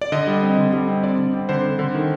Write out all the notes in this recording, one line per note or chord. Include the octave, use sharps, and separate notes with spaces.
D5
D3 D#5
G3
C4
D3
G3
C4
C4 D5
D3
C4
D3 C5
D3
D3
D#3